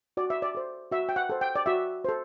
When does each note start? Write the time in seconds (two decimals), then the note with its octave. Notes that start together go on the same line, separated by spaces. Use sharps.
0.17 F#4 D5
0.30 E5
0.42 D5
0.55 A4 C5
0.92 F#4 E5
1.09 G5
1.16 F#5
1.30 A4 C5
1.41 G5
1.56 D5
1.66 F#4 E5
2.05 A4 C5